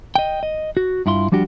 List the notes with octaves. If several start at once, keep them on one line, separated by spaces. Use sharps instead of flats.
D#5 G5
D#5
F#4
G2 E4 F4 C6
F3 G3 D4 F#4 G4